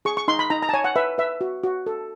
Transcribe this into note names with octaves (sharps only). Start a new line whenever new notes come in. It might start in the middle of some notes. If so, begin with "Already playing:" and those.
G#4 C#6
C#6
D#4 C6
B5
D#4 A#5
A#5
A5
C#5 G#5
F#5
B4 E5
B4 E5
F#4
F#4
A4